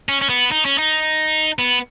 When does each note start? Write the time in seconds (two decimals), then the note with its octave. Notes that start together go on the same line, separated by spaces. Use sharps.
0.09 C#4
0.22 C#4
0.30 B3
0.52 D#4
0.65 C#4
0.78 D#4
1.59 B3